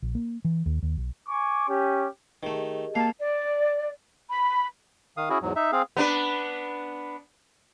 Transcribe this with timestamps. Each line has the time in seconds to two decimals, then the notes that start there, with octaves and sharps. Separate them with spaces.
0.02 A#1
0.15 A#3
0.45 E3
0.66 D#2
0.82 D#2
0.97 B1
1.29 G#5 C#6 D6
1.68 C#4 G4
2.43 D#3 A3 G4 G#4 D#5
2.95 A#3 F5 A5
3.19 D5
4.30 B5
5.17 D#3 F5 D#6
5.30 C#4 E4 F#4 G#4
5.42 E2 G#2 F#3
5.56 D#4 E5
5.72 C4 G#4 F5
5.97 B3 D4 B4